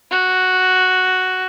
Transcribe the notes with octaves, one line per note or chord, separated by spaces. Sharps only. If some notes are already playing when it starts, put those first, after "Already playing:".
F#4